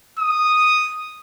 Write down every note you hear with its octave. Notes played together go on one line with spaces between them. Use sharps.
D#6